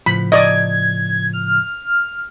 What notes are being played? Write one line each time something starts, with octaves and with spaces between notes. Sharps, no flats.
A2 C#3 F3 B5
D5 D#5 G#6
F6